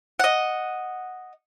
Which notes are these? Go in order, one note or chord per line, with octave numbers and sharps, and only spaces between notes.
D#5 F#5